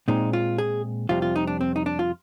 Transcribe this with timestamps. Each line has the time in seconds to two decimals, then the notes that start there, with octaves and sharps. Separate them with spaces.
0.08 A#2 G#3 C4 D#4
0.33 F4
0.58 G#4
1.09 F2 C3 G3 C4 F4
1.22 F4
1.36 D#4
1.47 D4
1.61 C4
1.76 D#4
1.86 D4
1.99 F4